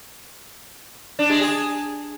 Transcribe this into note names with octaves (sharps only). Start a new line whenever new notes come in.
D4
G#3
G#4